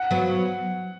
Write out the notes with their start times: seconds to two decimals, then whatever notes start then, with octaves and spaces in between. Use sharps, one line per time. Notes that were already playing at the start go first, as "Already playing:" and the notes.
Already playing: F#5
0.11 F#3 B3